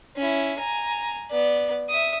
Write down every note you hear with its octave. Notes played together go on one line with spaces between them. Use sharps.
C#4 E4
G#5 A#5
B3 D5
E5 D#6